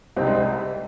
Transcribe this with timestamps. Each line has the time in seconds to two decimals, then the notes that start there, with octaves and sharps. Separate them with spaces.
0.16 C2 C3 G3 C4 D#4
0.27 G#3 C4
0.37 G#3